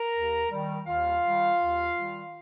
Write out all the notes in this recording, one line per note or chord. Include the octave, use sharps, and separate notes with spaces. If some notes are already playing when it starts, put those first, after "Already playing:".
Already playing: A#4 A#5
D#2
D#3 G3
D#2 F4 F5
D#3 G3
D#2
D#3 G3